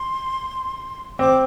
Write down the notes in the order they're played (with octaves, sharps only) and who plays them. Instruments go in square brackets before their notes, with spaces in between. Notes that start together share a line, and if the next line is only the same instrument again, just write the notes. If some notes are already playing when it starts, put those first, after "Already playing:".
Already playing: [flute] C6
[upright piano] C4 [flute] D6